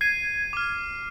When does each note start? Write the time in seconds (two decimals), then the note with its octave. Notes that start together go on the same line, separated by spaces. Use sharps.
0.01 G#6 C7 D#7
0.53 D6 F6